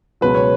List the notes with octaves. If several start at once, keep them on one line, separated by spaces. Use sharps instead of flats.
C#2 B2 F#3 B4
C#5